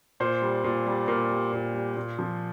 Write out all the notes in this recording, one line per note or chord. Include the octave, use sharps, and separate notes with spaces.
A#2 C5
G3
A#2
G3
A#2 A#4
G3
A#2
G3
A#2
F3